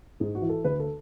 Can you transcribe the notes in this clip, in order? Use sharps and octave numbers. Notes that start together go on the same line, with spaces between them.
G#2 G#4
F#4
E3
A4
D2 B4
A4